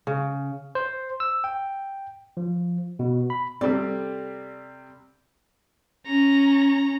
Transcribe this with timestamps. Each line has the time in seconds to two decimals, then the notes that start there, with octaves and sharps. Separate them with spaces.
0.07 C#3
0.75 C5
1.20 E6
1.44 G5
2.37 F3
2.99 B2
3.30 B5
3.61 C3 G3 C4 A4 D5
6.07 C#4 A#5